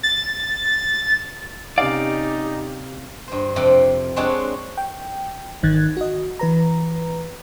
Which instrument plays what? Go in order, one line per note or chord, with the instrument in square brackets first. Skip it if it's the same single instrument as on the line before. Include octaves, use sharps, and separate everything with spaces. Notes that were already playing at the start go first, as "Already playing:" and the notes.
[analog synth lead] A6
[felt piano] C3 C#4 F5 [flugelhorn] D#4 [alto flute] G4 [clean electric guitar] D5
[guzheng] G2 C5
F2 C3 C4
G#3 C4 D4 C#5 F#5 A5
[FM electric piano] G5
G#1 D#3 F#6 G#6 A6
F#4 D#5
E3 B4 A#5